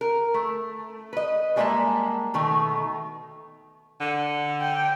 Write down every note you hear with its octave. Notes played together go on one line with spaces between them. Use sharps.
A#4
A3
B4 D#5
G3 G#3 A#3 D#5 E5 A5
B2 D#3 A3
D3
G5